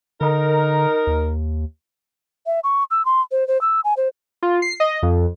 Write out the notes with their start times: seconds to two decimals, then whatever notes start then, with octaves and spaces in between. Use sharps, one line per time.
0.21 D3 D#4 A#4
1.07 D#2
2.46 E5
2.64 C#6
2.91 E6
3.05 C6
3.31 C5
3.48 C5
3.61 E6
3.84 G#5
3.97 C5
4.43 F4
4.62 C7
4.80 D#5
5.03 F2